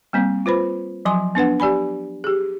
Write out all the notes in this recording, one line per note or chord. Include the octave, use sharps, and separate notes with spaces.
G3 A#3 C4
F4 B4 C5 B5
F3 F#3 G#5 C6
B3 D4 B4 F#5
G4 D5 G#5 B5
G4 G#4